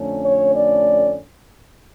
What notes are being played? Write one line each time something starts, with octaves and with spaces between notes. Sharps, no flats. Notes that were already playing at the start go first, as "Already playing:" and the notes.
Already playing: F2 D3 A3 C#4
C#5
D5